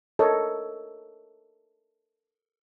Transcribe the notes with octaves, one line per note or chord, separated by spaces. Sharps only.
A4 A#4 C#5 D#5